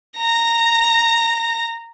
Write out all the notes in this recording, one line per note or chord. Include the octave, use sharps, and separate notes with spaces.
A#5 A#6